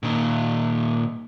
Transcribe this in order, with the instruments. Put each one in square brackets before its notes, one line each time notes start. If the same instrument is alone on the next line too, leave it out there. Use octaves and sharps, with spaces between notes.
[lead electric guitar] A#2 D#3